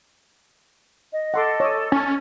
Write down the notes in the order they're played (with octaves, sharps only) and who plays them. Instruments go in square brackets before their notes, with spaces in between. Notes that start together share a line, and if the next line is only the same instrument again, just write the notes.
[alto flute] D#5
[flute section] A4 [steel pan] F#5 C6 D6
[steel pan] C#5 D6 D#6
[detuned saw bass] C#4 [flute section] A4